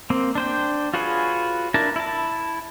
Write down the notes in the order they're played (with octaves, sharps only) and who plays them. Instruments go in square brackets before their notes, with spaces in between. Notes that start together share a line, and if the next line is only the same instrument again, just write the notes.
[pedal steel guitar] A#3 C4
D4 C5 G5
F4 F#4 G#4 B4 C#5
D4 E4 A#4 A5
E4 A5